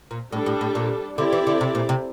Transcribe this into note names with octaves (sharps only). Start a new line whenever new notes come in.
A#2
A2 G3 D4 A4
A2
A2
A#2
D3 C4 E4 G4 D5
E3
D3
C3
A#2
C3